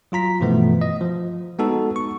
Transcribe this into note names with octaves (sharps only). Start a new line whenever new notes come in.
F#3 F4 A#5 B6
G2 B2 E3 F3 A3 B3
D#5
F3
G#3 B3 D#4 F#4 A4
C#6